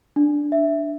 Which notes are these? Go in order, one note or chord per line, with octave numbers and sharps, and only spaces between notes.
D4
E5